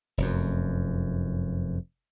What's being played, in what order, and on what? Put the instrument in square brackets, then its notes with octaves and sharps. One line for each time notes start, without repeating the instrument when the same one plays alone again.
[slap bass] F1 F#2